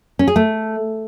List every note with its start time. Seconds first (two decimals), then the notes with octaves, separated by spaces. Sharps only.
0.19 C#4
0.28 G#4
0.36 A3